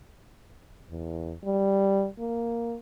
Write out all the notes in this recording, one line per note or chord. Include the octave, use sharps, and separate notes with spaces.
E2
G3
A#3